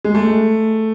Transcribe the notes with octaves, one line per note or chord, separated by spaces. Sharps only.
G#3
A3